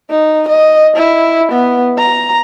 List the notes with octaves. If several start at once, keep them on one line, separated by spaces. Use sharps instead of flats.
D#4
D#5
E4
B3
A#5